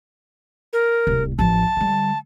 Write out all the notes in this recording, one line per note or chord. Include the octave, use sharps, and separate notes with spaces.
A#4
D1 C2
A1 F3 A5
D3 G3